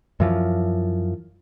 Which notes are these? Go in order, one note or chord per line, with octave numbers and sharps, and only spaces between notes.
F#2 E3 F3